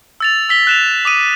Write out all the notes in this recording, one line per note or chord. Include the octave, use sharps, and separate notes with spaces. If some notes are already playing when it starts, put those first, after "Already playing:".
E6 A6 F7
E6 B6 G7
F#6 E7 F7
D6 D#6 D#7